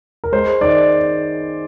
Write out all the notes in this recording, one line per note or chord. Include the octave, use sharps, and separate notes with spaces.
A#4
G#3 C5
D#3 D5